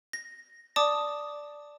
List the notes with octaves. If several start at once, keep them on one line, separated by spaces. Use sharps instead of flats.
A#6
D5 A5 D6 D#6